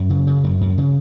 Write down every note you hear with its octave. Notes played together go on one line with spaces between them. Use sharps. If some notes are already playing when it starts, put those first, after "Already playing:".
Already playing: F#2 C#4
C#3
C#3
F#2
F#2
C#3